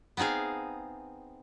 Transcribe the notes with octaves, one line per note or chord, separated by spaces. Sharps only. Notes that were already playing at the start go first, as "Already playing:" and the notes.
B3 C4 D#4 G#4 F5